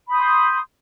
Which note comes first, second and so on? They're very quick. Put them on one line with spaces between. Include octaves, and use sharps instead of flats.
B5 D#6 G6 C6